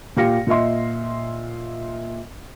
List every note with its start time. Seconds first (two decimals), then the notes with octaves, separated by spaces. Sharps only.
0.17 A#2 G4 F5 A#6 C#7
0.47 A#2 F4 D#5 E5 C6